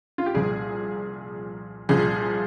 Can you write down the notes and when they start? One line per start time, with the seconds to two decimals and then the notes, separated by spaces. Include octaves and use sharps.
0.18 F4
0.26 G4
0.34 C2 A#2 F3 G#4
1.89 C2 A#2 F3 G#4